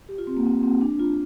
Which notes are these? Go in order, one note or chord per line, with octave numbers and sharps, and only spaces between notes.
G4
F4
C4
A#3
C4
C4
D4
F4